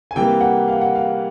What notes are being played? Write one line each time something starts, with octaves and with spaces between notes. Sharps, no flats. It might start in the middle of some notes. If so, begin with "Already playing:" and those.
G#5
C3 E3 G3 A#3 G5
F#5
F5
F#5
F5